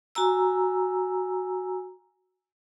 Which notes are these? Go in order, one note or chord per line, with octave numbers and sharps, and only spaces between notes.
F#4 G#5 A#5 E6